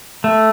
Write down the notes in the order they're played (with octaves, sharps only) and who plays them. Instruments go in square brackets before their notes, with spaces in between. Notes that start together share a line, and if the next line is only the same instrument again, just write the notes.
[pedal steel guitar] A3